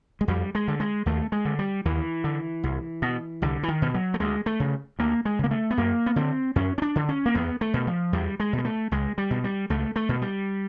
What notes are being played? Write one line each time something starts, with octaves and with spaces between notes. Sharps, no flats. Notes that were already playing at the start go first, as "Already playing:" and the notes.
G#3
F2 G3
G#3
D3
G#3
D#2 A3
G#3
D3
G3
D#2 E3
D3
C2
B2
C2 D3
E3
D#3
B2
F#3
A3
D2 G#3
A3
C#3
D2 A#3
G#3
C#3 A#3
A3
B3
F#2 A#3
B3
D3 C4
F#2 C#4
C#4
D4
D3
C#4
A#3
E2 B3
A3
B2
F3
E2 G3
G#3
B2 G#3
A3
C#2 G#3
G3
B2
G3
C#2 A3
A3
B2
G3